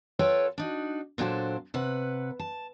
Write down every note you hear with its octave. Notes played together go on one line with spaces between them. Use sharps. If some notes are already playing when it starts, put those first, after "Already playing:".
F4 A4 B4 C#5 G5
D4 D#4 F#4
A#2 F#3 D4 F#4 A4 C5
C3 B4 F#5
A5